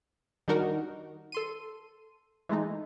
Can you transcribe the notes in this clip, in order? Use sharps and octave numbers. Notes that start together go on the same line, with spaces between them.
D#3 G3 D4 D#4 F#4 A#4
A4 C6 D#7
E3 G#3 A3 D#4